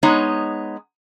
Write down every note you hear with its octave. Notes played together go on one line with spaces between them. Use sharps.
G#3 B3 D#4 C#5